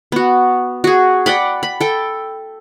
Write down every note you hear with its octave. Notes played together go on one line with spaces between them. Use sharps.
B3 F#4
F#4 G#4
D5 F#5 G5 B5
B5
A4 G5